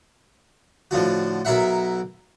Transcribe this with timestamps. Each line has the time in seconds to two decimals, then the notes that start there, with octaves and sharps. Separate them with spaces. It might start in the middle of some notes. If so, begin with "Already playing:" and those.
0.91 A2 D3 F3 F#4
1.45 B1 F#3 A#4 E5 F#5